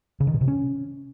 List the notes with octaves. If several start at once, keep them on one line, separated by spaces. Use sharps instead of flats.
C#3
D#3
B2
C3
C#4